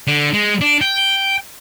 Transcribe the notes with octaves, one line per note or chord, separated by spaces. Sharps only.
D3
G#3
D4
G5